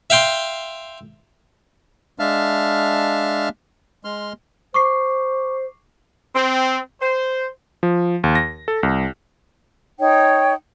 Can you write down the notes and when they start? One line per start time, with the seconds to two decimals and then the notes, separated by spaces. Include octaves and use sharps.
0.10 E5 F5 G5 C6
2.19 G#3 D4 E5 F5 A5 F6
4.05 G#3 C6 F6
4.74 C5 C#6 D6 C7
6.35 C4
7.01 C5
7.83 F3
8.24 D#2
8.35 A#6
8.68 A4
8.83 C2
9.99 D#4 C#5 G5